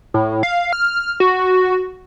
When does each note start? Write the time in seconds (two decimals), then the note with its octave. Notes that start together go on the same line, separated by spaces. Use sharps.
0.14 A2
0.43 F5
0.73 F6
1.20 F#4